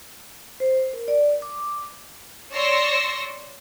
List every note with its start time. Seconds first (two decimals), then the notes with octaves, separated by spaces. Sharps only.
0.60 C5
0.93 A#4
1.08 D5
1.42 D6
2.53 C#5 D5 C6 C#6 E6 A#6